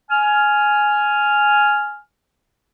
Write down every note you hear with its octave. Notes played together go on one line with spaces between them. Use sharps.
G#5 F6